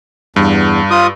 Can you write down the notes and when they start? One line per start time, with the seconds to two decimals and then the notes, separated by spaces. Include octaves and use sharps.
0.36 E2 G2
0.91 F4 D#6